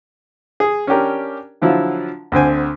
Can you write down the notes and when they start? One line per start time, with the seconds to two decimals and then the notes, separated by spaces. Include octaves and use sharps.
0.60 G#4
0.87 C#4 D4 G4 A#4
1.62 D3 F3 F#3 E4 F4
2.32 D2 D3 C4 G#5